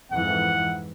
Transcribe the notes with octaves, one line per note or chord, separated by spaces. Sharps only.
F2 G#2 E3 F#5